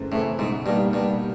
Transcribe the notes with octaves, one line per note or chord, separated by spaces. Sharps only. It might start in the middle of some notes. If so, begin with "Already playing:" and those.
Already playing: F#2 C#3 E3 A3 C4
A2 C#3 E3 A3 C4
G#2 B2
G2 G3 A#3 D#4
G2 B2